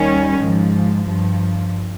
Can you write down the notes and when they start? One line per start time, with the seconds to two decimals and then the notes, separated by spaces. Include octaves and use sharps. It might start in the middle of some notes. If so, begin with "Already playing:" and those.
Already playing: D#2 D#3 G3 C#4
0.39 G#2
0.44 F3
1.07 G2 F3